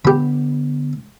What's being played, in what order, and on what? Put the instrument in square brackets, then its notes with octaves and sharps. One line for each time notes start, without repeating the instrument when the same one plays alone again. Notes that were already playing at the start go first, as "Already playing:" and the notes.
[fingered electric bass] D3 B3 [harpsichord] G4 B5